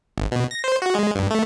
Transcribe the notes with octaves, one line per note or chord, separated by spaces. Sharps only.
G#1
B2
A#6
C5
F#4
G#3
G2
A3